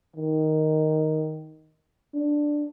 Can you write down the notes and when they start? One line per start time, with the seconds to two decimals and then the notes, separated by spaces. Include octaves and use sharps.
0.16 D#3
2.14 D4